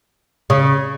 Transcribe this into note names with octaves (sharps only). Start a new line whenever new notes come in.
C#3